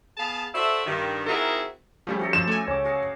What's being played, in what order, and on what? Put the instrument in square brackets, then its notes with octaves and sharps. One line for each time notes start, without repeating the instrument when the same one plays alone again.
[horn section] B3 G#4 F5 A5
F#4 A4 C5 D5 E5
G2 D#3
C4 D#4 E4 F#4 G#4 A#4
[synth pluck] F3 G3 A3 [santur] C#4 G4
[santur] C#4 D#4 A4 [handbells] F#4
[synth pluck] F3 [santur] D#4 E6 [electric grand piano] E7
[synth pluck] A3 G#5 [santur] C#6
[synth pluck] C#2 [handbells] C#5 D6
[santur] F#4 G#4 F5